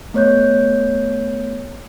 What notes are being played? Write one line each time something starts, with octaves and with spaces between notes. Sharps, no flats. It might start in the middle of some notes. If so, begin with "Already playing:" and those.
A3 B3 C#5 F#6 G6